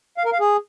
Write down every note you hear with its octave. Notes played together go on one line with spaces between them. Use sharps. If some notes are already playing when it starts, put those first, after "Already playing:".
F5
A#4
F5
G#4